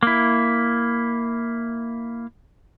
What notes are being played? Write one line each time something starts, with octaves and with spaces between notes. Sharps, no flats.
A#3 E4